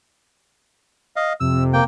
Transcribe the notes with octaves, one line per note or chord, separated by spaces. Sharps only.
D#5 F5
F2 C3 E6
A#3 G5